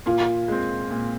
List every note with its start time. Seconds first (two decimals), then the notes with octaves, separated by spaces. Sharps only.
0.06 A#2 F4
0.48 G#3 C4
0.90 A#2